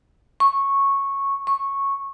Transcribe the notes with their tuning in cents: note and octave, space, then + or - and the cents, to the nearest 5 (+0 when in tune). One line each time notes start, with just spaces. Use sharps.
C#6 -10
C#6 -10